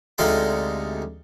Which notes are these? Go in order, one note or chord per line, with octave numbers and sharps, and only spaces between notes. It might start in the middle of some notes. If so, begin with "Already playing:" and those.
D2 C3 G#3 D#4 F5 C6